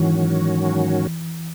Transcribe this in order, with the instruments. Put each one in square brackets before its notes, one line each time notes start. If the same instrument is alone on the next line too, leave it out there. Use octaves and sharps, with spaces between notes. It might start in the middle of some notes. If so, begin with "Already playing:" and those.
Already playing: [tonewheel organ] G#2 D#3 F#3 C#4 F#4 [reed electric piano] E3